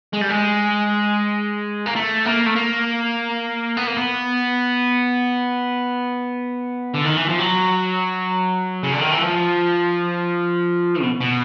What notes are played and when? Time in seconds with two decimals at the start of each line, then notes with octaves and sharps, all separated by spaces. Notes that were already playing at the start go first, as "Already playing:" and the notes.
0.13 G#3
0.22 G3
0.30 G#3
1.86 A#3
1.96 A3
2.25 A#3
2.46 A3
2.55 A#3
3.77 B3
3.87 A#3
3.97 B3
6.94 D3
7.04 D#3
7.16 E3
7.28 F3
7.39 F#3
8.83 C#3
8.92 D3
9.01 D#3
9.11 E3
9.21 F3
11.02 B2
11.21 B2